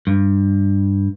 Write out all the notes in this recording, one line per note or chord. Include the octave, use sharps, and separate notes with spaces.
G2